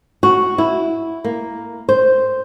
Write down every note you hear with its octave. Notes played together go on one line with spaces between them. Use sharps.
F#4
E4
A#3
C5